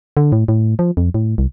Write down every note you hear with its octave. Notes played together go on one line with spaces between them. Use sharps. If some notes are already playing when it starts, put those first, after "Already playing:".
D3
A2
A2
F3
F2
A2
C2